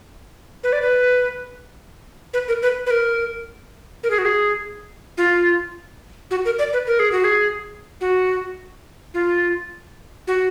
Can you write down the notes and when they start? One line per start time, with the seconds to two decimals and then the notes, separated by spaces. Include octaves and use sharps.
0.64 B4
0.73 D5
0.82 B4
2.34 B4
2.48 A#4
2.62 B4
2.86 B4
2.91 A#4
4.03 A#4
4.11 G#4
4.18 F#4
4.25 G#4
5.18 F4
6.31 F#4
6.45 A#4
6.59 D5
6.73 B4
6.87 A#4
6.99 G#4
7.12 F#4
7.24 G#4
8.01 F#4
9.14 F4
10.27 F#4